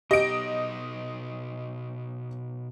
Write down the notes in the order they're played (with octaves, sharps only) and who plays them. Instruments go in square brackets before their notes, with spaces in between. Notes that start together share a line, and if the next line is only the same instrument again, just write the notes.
[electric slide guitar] B2 D#4 [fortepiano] G4 [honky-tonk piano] D#5 D7